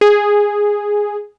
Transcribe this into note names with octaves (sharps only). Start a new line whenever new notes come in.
G#4